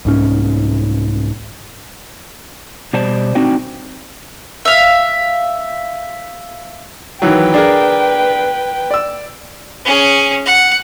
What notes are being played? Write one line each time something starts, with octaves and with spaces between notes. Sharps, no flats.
C2 G#2 C#4
B2 G3 C5 D5 A5
C4 D4 D#4 F#4 G5
E5 F5
D#3 E3 F#3 B4 G5
D4 G#4 A#4
D5 E6
C#4 G#4
F#5